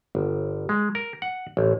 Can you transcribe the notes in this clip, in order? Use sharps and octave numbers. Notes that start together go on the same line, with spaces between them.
G1
G#3
A#4
F#5
A1